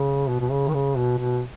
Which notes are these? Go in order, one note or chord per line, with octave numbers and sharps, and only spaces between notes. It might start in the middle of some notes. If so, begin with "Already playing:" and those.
Already playing: C#3
B2
B2
C#3
D#3
C#3
B2
B2